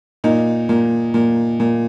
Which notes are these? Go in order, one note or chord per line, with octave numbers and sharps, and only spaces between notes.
A#2 D#4
A#2
A#2
A#2